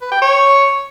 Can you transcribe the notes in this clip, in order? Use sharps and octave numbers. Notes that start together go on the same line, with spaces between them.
B4
G5
C#5